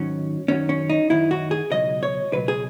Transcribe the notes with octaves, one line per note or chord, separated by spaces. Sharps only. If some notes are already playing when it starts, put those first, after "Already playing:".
Already playing: G#2 D#3 F#3 C#4
F#2 D#3 F#3 C#4
C#4
D#4
F#2 D#3 F#3 E4
F#4
G#4
C#2 B2 F#3 D#5
C#5
C#2 B2 F#3 B4
G#4